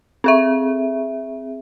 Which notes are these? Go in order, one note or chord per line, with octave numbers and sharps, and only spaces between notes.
C4 G#4 E5